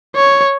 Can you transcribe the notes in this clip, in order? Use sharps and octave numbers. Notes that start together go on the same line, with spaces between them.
C#5